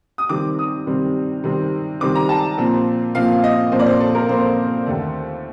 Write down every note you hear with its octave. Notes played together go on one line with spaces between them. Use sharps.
D#6
C3 D#3 G3 C4 D6
D#6
C3 D#3 G3 C4
C3 D#3 G3 C4
C3 D#3 G3 C4 D6
A#5
A5
A#2 F3 C4
A#2 F3 C4 F5
D#5
A#2 F3 C4 C5
D5
C5
A4
A#4
A#2 F3 C4 C5
D#2 D3 A3